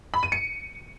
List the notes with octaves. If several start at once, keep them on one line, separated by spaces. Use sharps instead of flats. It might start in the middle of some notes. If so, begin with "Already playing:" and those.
B5
D#7
C#7